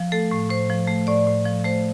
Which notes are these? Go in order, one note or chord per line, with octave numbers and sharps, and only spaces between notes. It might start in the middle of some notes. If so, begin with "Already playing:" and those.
Already playing: F3
A3 A4
A2
A2 C5
F3
A3
A2 D5
A2
F3
A3 C5